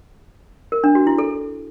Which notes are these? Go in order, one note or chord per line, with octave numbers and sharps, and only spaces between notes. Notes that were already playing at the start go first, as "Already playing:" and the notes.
A#4
D4
F#4
E4
A4